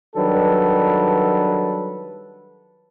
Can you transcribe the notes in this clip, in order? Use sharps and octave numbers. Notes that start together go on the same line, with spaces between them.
D#3 F#3 G3 D4 A4 B4